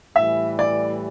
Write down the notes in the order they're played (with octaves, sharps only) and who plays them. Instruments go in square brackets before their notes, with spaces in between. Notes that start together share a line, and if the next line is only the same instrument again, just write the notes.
[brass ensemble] A2 E3 G3 [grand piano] E5
[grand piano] D5